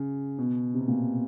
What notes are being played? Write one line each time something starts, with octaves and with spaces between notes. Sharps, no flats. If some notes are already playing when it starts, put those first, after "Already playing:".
Already playing: C#3
B2
C3
B2
A#2